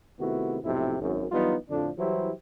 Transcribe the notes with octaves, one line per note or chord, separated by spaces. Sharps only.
C3 D#3 A3 B3 E4 F#4
B1 F2 A2 C3 C4 E4
G#1 F#2
E3 F#3 G3 B3 D#4 F4
F2 A2 D3 F3 D4
E3 F#3 G3 E4 G4 C5